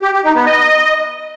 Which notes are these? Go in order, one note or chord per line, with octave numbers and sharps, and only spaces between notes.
G4
G4
D#4
B3
D#5